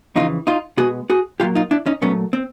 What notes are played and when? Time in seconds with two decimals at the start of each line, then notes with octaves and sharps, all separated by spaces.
0.16 F2 C#3 E3 D#4 F4
0.47 D#4 F4
0.77 B2 G#3 B3 F#4 G#4
1.10 F#4 G#4
1.40 A#2 F#3 A#3 F4 G4
1.55 D#4 F4
1.71 D4 E4
1.86 C#4 D#4
2.02 A#2 F#3 A3 B3 C#4
2.33 C4